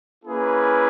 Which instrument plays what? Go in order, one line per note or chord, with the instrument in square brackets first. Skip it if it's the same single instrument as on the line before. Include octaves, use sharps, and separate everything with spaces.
[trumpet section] A#3 C#4 E4 G#4 B4